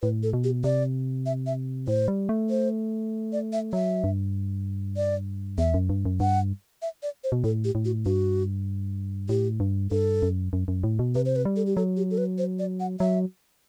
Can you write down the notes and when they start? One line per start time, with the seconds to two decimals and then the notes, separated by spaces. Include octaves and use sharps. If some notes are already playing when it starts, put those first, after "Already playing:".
0.02 A2 B4
0.23 A4
0.33 B2
0.44 G4
0.64 C3 D5
1.26 E5
1.47 E5
1.88 A2 C5
2.08 G3
2.29 A3
2.50 C5
3.33 D5
3.53 E5
3.73 F#3 E5
4.04 G2
4.97 D5
5.58 E2 E5
5.74 F#2
5.89 G2
6.05 F#2
6.20 G2 F#5
6.82 E5
7.03 D5
7.24 C5
7.32 B2
7.44 A2 A4
7.64 G4
7.75 A2
7.85 F#4
8.06 G2 F#4
9.29 A2 G4
9.60 G2
9.91 G2 A4
10.22 F#2
10.53 F#2
10.68 F#2
10.84 A2
10.99 B2
11.15 C3 B4
11.26 C5
11.36 B4
11.45 G3
11.56 A4
11.66 G4
11.76 F#3 A4
11.97 G4
12.11 A4
12.18 B4
12.38 C5
12.59 D5
12.80 F#5
13.00 F#3 E5